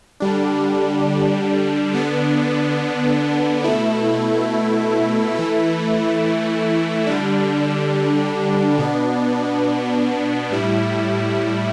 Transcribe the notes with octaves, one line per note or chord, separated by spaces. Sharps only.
D3 G3 D4
D3 B3 D4
B2 A3 E4
E3 A3 E4
D3 G3 D4
B2 B3 D4
A2 G3 E4